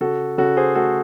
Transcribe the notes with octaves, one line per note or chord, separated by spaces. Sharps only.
C#3 F#4 A4
C#3 F#4 A4
G#4 C5
A3 F#4 A4